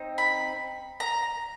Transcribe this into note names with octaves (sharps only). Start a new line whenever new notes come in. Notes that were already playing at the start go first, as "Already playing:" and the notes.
Already playing: C4 D#4
B5
A#5